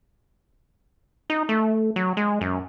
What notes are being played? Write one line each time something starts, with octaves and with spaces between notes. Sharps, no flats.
D#4
A3
F#3
G#3
F#2